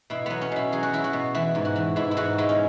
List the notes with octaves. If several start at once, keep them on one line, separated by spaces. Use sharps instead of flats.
B2 E4
F#3 B3
C#4
B2 E4
F#3 G#4
F#4
F#3 E4
F#4
B2
E3 E4
G#2
F#4
E3
G#2 E4
E4
G#2 F#4
G#3 E4
C#4